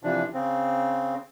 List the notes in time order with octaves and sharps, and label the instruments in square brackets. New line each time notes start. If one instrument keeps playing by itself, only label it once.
[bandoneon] C3 E3 F3 D4
C#3 C4